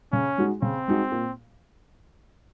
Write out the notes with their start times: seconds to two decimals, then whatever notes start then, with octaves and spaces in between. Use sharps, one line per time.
0.12 C#3 C#4
0.38 G#3 D#4 F#4
0.62 C#3 C4
0.88 G#3 D#4 F#4
1.12 A#2